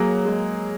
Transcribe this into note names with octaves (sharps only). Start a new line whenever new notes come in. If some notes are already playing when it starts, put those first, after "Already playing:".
Already playing: F#3 A#3 G#4
G#3